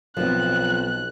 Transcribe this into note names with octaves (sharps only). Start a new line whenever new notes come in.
B1 F3 C4 F#6